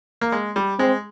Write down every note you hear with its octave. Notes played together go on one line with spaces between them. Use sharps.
A#3
G#3
G3
G#3 C4